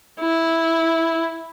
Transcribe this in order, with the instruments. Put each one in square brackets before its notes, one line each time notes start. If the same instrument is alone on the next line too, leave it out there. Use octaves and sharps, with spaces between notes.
[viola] E4